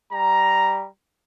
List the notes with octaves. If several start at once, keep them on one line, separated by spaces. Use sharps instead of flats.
G3 A#5